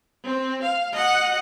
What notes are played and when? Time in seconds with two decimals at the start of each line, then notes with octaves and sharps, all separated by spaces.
0.24 C4
0.62 F5
0.93 D#5 F#5